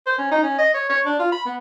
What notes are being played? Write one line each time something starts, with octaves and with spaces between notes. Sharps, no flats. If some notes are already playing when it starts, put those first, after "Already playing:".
C5
C#4
D#4
C#4
D#5
C#5
C#5
D4
F4
B5
B3